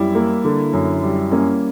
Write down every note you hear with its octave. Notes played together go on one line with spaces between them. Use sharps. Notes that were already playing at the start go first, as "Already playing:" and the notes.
Already playing: F#2 G3 E4
A#3
D3
F#2
G3
A#3 C#4